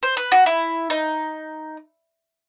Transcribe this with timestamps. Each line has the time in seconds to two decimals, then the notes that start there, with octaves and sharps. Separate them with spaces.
0.03 C5
0.17 B4
0.32 F#4
0.46 E4
0.90 D#4